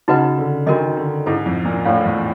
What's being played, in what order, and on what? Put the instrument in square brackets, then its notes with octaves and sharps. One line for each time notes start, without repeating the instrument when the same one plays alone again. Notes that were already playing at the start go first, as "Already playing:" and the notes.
[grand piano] C#3 [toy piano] D#4 F#4 B4 D#5 F#5
[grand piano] D3
[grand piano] D#3 [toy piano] D4 F#4 A#4 D#5
[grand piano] D3
[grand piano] G#2 [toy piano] E4 A4 C5
[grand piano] F2
A#2
[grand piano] A2 [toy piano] A4 D5 F5
[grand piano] E2